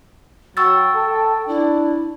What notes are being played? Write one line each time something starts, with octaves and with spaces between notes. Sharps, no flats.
F#3 G5 C#6 E6 A6
A4
D4 E4